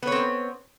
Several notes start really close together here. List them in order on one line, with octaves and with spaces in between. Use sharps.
B3 C#5 C4